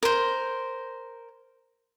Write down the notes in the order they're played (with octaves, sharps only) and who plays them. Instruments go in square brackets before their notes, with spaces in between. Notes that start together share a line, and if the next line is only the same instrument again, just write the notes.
[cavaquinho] A#4 C5